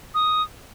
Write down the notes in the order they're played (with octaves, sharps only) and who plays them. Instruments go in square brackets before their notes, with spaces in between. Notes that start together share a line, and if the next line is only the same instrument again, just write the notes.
[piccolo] D#6